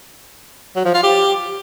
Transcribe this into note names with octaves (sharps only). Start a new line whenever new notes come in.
F#3
F3
F4
G4